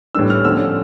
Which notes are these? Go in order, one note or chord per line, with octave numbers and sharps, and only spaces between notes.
A2 E3 G3 D4 E6
F6
D3 F3 A3 C#4 E6